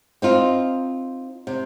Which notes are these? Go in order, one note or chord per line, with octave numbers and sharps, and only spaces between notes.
C4 D#4 F4
C3